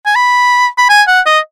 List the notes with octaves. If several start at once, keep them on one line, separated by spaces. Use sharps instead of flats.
G#5
B5
B5
G#5
F#5
D#5